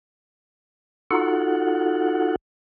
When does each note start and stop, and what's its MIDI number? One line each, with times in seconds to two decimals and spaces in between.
1.11 2.36 63
1.11 2.36 65
1.11 2.36 66
1.11 2.36 69
1.11 2.36 78